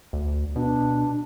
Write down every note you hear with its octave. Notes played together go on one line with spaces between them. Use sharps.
D2
B2 D4